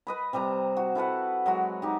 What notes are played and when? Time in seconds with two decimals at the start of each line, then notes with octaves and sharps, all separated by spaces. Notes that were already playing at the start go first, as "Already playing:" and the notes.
0.07 B4 D#5 B5
0.33 C3 G3 C5 A#5
0.77 F#4
0.95 E4 A4 B4 F#5
1.46 F#3 G#3 F#4
1.82 D#4 G4